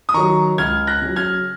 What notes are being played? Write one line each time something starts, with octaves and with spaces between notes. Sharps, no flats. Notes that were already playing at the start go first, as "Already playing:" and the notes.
D#6
D#3 F#3 A#5 C#6
C#2 F6 G#6
F#6 A#6
C#3 F#3
F6 G#6